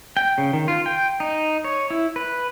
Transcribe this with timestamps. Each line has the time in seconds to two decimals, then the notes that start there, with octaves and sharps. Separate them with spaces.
0.17 G5
0.38 C#3
0.53 D#3
0.68 F4
0.86 G5
1.20 D#4
1.64 C#5
1.90 E4
2.16 B4